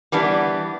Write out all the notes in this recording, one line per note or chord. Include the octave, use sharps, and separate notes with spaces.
E3 G3 B3 D4